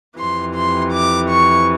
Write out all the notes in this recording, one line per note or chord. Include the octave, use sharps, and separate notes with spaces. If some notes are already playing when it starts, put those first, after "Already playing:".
F2 C3 E3 C6
C6
D6
C#6